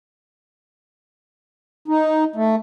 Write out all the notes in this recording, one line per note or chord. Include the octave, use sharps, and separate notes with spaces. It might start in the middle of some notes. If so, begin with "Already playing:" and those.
D#4
A3